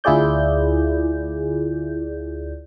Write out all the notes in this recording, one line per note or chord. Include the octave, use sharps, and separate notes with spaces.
D2 E4 F4 G#4 D5 G6